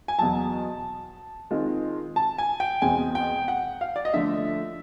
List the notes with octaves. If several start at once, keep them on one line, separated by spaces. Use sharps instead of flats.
G#5
E2 B2 F#3 A5
D#3 G#3 C4 F4
A5
G#5
G5
E2 B2 G#3 C4 G#5
G5
F#5
F5
D5
D#5
D3 F3 A3 E5